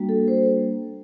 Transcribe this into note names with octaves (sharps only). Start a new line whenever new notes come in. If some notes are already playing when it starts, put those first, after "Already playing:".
Already playing: G3 A#3 D4 F#4
A4
C5